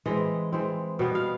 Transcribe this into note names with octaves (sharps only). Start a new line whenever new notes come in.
E3 G#3 C4 D#5
E3 G#3 C4
B2 G3 B3 D#5
F5